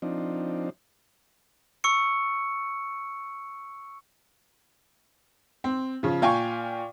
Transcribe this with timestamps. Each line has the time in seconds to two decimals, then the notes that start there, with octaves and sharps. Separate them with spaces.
0.02 F3 C4 D4 D#4
1.84 C#6 E6 C#7
5.64 C4
6.03 C#3 F3
6.22 A#2 F5 G5 G#5 C#6